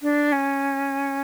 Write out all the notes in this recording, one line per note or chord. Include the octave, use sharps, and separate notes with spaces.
D4
C#4